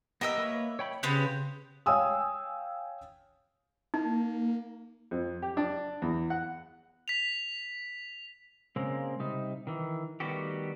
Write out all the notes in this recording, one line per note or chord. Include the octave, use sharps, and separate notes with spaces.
B3 G4 A#4 D#5 E5 E6
A#3 B4 C#5
C#5 G5 B5
C#3 B3 C4 G4 F#6
C#5 F5 G5 G#5 D#6 E6
A#3 D#4
F2
G4
D4
E2
F#5
B6 F7
C#3 G#3 A#3 C4
C3 G3 D#4
D#3 E3
D#3 G3 A3 B3 F#4 G4